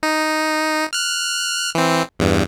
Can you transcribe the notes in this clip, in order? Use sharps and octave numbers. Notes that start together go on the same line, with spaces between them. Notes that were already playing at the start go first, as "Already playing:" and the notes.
D#4
F6 F#6
E3 C4
E2 G2